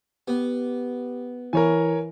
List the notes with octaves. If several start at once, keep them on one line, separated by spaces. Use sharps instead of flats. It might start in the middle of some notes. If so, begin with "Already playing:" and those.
B3 G4
E3 E4 A#4 C#5 G#5